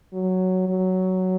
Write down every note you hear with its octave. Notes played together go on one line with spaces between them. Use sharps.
F#3
F#3